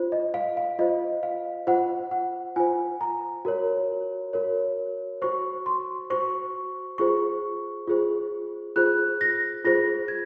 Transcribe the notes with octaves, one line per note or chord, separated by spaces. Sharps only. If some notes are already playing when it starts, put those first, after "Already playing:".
Already playing: F4 C5
D#5
F5
F5
F4 C5 D#5
F5
F4 C5 F#5
F#5
F4 C5 G#5
A#5
F#4 A#4 C#5
F#4 A#4 C#5
F#4 C5 C#6
C6
F#4 C5 C#6
F4 G#4 C5 C#6
F4 G#4 C5
F4 G#4 C5 F#6
A#6
F4 G#4 C5 A#6
G#6